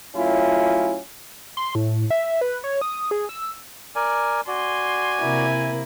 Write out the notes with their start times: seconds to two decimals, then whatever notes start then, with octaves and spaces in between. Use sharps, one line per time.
0.15 A2 F#3 C#4 E4 F4
1.57 C6
1.75 A2
2.10 E5
2.41 B4
2.64 C#5
2.81 D#6
3.11 G#4
3.29 E6
3.95 A#4 D5 G#5
4.47 F#4 D5 G#5 C6
5.20 C3 A#3 E4